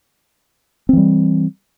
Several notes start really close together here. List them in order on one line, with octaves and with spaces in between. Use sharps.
C4 E3 G3